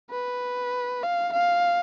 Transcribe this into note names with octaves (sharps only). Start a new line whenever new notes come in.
B4
F5
F5